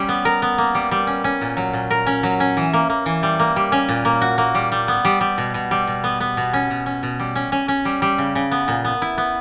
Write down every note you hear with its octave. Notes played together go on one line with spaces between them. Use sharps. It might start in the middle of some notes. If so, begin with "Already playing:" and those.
Already playing: G3 C#4
B3
A#4
B3
A#3
G3
G3
C#4
C#4
A#2
F#3
A#2
A#4
C#4
F#3
C#4
E3
A#3
A#3
E3
G3
A#3
G3
C#4
A#2
A#3
F#4
A#3
G3
G3
B3
G3
G3
B2
B2
G3
B2
B3
B3
B2
C#4
B2
C#4
B2
G3
C#4
C#4
C#4
G3
G3
C#3
C#3
B3
A#2
B3
E4
B3